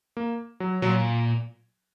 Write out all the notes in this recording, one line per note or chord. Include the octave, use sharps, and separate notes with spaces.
A#3
F#3
A#2 F#3